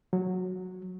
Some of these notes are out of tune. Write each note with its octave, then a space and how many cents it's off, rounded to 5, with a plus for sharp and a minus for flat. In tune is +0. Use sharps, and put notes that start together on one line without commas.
F#3 -10